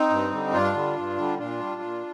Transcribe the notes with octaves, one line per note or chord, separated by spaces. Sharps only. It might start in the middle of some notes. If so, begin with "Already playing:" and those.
Already playing: C4 D#4
G2
D3 G3
G2 D4 F4
D3 G3
G2
D3 G3
A#2 D4 F4
G3
A#2